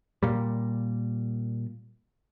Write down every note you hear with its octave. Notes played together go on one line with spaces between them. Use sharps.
A#2 G3